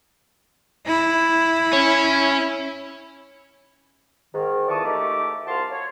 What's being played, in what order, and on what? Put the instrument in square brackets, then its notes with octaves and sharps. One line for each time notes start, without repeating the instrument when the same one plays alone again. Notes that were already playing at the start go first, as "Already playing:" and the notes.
[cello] E4
[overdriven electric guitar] C#4
[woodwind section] G#2 D#3
F2 E3 D5 A5 C#6 D#6
D#2 A3 D#4 G4 D6
C2 F3 F#4 F5 A5 C6
C#5